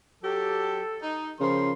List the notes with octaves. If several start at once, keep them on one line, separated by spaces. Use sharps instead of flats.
F#3 G4 A4
D#4
C#3 F3 A#4 C6